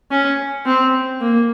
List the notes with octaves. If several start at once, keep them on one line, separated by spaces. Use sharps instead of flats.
C#4
C4
A#3